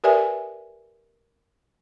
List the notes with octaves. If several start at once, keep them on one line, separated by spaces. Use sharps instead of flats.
G4 A#4 B4 D5 E5 G#5